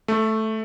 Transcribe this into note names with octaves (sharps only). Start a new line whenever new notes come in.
A3